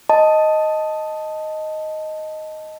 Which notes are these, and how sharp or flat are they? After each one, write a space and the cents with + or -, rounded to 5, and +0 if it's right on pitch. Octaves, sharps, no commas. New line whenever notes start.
D#5 +0 A5 +0